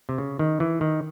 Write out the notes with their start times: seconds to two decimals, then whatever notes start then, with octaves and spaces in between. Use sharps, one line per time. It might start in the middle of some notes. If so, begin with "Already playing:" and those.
0.09 C3
0.18 C#3
0.39 D#3
0.60 E3
0.81 D#3